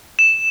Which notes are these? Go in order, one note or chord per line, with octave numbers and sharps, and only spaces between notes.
E7